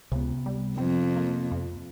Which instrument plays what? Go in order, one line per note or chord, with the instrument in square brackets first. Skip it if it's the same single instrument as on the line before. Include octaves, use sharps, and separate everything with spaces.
[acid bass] C#2 [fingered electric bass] C3 B3
[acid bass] G3
[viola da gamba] F2 [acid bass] C4
[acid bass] A#3
F2